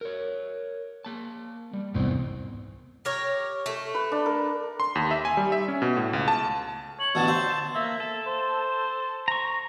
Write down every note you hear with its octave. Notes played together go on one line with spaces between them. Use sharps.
A#4 C#5
A#3 A5
G3
E1 C2 G#2 B3 E4 C5
G4 A#4 C#5
A3
B4
D4
A#4
C6
D#2
E5
G#5
G3
E5
C#4
B2
A2
C#2
A5
C#5 F#7
A1 B2 D3 A5
C5 E5
A#3 E5
A4
C5
A#5 C#6